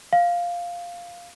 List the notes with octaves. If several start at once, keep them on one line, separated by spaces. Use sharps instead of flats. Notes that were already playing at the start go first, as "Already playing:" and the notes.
F5